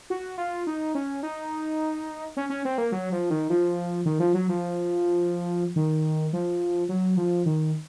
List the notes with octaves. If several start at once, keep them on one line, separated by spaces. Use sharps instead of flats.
F#4
F4
D#4
C#4
D#4
C#4
C#4
C4
A#3
F#3
F3
D#3
F3
D#3
F3
F#3
F3
D#3
F3
F#3
F3
D#3